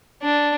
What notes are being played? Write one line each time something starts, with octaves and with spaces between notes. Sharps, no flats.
D4